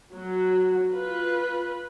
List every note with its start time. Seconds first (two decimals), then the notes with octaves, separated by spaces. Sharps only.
0.12 F#3
0.92 F4 B4